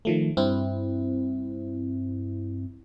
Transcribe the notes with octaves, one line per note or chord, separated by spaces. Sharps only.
D#3 F3 A3
G2 C4 E4